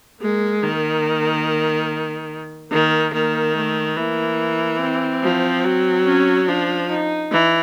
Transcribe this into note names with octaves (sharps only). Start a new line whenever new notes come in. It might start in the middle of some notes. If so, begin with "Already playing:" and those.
G#3 A#3
D#3 A#3
D#3 A#3
D#3 A#3
A3
E3 A#3
C4
F3
F#3
C#4
F3 D4
D#4
E3